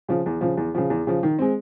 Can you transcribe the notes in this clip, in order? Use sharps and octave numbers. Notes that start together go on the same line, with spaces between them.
C#3 F3
E2
C#3 F3
E2
C#3 F3
E2
C#3 F3
D#3
G#3 C4